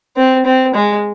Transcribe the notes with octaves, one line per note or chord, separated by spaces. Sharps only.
C4
C4
G#3